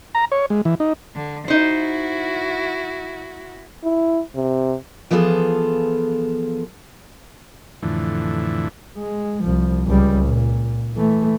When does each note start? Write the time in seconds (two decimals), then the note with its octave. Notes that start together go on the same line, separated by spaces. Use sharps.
0.15 A#5
0.32 C#5
0.50 G#3
0.65 E3
0.80 D#4
1.15 D3
1.48 D#4 E4 F#4 C5
3.84 E4
4.36 C3
5.11 E3 F3 B3 F4 G#4 A4
7.83 F2 A2 D3 E3
8.98 G#3
9.44 C2 F3
9.87 C#2 G3
10.26 A#2
10.93 E3 A3